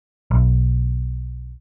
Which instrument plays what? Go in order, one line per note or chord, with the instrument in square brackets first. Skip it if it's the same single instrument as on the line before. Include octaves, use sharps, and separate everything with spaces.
[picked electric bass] B1